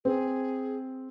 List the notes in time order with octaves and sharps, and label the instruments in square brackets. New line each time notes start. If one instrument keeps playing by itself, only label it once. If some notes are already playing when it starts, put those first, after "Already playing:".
[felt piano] C4 [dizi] G#4